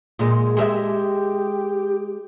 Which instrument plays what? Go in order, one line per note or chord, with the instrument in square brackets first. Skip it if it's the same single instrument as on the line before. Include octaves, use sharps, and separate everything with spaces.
[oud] A#2 G#3
[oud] G#3 A4 E5 [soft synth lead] G4